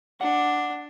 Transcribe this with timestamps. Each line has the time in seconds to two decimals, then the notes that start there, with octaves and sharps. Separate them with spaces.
0.21 D4 F#5